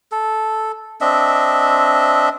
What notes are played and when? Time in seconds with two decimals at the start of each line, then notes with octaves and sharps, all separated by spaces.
0.12 A4
1.01 C4 D4 D#5 E5